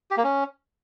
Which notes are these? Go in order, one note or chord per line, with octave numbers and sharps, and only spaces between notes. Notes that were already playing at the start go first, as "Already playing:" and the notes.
G4
A#3
C#4